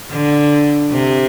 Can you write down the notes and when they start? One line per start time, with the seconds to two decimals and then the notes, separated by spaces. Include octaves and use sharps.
0.10 D3
0.91 C3